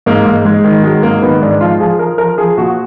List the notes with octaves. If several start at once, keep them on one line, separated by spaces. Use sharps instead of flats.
G#2 A#3
G#2
G#2 G#3
D#3
F#3 G#3
G#2 A#3
D#3 B3
G#2 D4
F3 F4
F3 G#4
F3 A#4
F3 A#4
F3 G#4
A#2 F#4